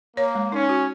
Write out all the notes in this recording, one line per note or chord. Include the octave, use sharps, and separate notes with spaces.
A#3 C#5
G#3
C#4 D#4
F#4